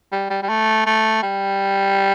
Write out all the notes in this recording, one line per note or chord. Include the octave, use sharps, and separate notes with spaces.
G3
G3
G3
A3
A3
G3